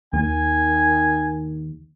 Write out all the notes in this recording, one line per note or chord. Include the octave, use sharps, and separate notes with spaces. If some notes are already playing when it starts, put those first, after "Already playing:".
D#2 D#3 G#5